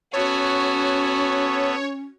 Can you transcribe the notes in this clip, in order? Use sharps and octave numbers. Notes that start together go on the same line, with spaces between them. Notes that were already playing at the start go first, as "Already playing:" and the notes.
B3 C#4 F#4 A4 C#5